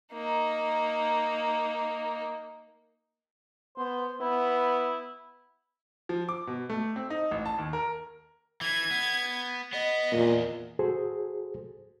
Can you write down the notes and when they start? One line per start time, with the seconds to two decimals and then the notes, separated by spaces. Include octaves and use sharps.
0.13 A#3 D#4
3.77 B3 C5
4.21 B3 E4
6.09 F3
6.29 D6
6.47 B2
6.70 A3
6.96 C4
7.10 D#4
7.31 A1
7.46 A5
7.58 D#2
7.73 A#4
8.61 E3 G#6
8.91 B3
9.73 B3 D#5
10.12 B1 E2 A#2
10.79 F#4 G#4 A4 C5